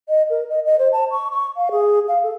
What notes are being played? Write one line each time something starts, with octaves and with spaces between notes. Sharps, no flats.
D#5
A#4
D#5
D#5
C5
A5
C#6
C#6
F5
G#4
F5
A4